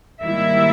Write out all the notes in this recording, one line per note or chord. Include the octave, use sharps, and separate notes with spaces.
G#2 D#3 G3 A#3 E4 E5